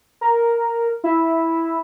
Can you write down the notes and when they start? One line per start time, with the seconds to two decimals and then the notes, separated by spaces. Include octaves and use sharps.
0.21 A#4
1.04 E4